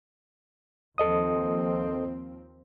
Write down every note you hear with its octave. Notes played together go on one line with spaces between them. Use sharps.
D#2 F3 C4 A4 D#5 D#6